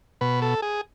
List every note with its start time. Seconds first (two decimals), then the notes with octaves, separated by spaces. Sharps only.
0.21 B2 B4
0.42 A4
0.62 G#4